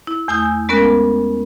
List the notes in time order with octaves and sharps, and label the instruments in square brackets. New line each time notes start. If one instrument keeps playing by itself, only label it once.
[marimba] E4
E2 A3 G#5 D#6 E6 G6
G#3 B3 C#4 A#4 F#6